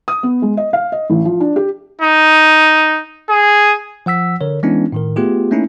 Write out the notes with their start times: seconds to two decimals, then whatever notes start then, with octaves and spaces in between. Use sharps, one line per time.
0.08 D#6
0.23 B3
0.42 G#3
0.57 D#5
0.73 F5
0.92 D#5
1.10 A1
1.25 F3
1.40 D4
1.56 G4
2.02 D#4
3.30 G#4
4.06 F3 F#5 E6 B6
4.41 D3 A#4 C#5
4.63 E3 G#3 B3 C#4 D4 E4
4.92 A2 D#3 A#4
5.16 A3 B3 F4 G4 G#4
5.51 A3 A#3 C#4 D#4 E4